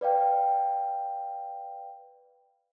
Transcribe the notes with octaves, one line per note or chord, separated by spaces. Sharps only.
B4 D5 F5 G5